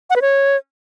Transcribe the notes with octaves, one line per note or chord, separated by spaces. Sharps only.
F#5
B4
C#5